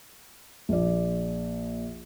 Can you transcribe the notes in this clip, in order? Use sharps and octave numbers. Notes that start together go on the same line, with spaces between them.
A#1 D5